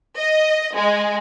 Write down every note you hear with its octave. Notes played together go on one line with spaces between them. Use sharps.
D#5
G#3